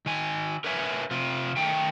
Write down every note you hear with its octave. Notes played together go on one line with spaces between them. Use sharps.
D#3 G#5
A#4 B4 C#5 E5 G#5
C3 F4
D#3 A3 G5